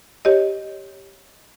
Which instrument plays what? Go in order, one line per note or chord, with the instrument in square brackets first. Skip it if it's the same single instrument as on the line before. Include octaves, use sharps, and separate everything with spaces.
[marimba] G4 C#5 D#5